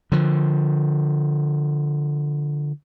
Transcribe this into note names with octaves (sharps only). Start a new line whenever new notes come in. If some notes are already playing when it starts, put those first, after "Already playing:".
D3 F3